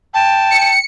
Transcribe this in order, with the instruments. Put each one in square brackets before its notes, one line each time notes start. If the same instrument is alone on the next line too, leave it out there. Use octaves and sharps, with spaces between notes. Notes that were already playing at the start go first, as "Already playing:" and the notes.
[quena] G5 [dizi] A5
[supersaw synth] C#7